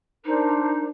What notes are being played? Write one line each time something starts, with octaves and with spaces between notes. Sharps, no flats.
D4 D#4 A#4 C5